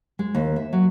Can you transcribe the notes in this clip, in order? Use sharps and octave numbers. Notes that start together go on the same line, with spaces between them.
G#3
D#2
E5
F#3